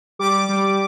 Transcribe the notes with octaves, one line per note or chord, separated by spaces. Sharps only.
G3 D6
G3